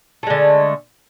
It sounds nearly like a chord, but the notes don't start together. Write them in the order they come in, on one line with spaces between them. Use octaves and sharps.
A3 G#3 D3